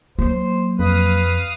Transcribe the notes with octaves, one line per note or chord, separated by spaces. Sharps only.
F#3 A#3 C5
F2 B4 F5 D#6